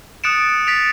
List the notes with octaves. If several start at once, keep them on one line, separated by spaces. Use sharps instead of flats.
D#6 F#6 A6 C#7 D7 E7
A6 B6 D7 F7